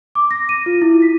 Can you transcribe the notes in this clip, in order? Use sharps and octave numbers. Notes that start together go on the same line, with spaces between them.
D6
A#6
D#7
F4
E4
B6